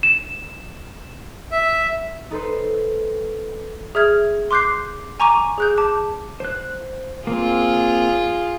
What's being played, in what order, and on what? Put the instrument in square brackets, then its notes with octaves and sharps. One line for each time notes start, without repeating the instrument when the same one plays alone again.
[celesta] E7
[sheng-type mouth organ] E5
[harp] D#4 A4 B4 C5
[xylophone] G#4 E5 F6 G#6
C6 D6 F#6 G6 C7
G#5 A#5 C#6 D6 D#7
G#4 F#6 G6
A5 D6
[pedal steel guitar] C5 F#6
[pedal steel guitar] A#3 C4 [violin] F4 G#4